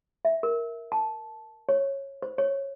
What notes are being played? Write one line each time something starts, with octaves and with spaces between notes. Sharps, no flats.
E5
A#4
A5
C#5
C5
C#5